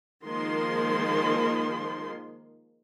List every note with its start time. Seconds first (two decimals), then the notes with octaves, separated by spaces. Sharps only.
0.25 D#3 F3 G#3 A#3 C6